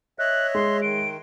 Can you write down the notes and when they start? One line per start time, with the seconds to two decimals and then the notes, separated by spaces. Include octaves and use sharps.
0.19 C#5 D#5 E5 F#6
0.55 G#3 C6
0.82 D#3 D7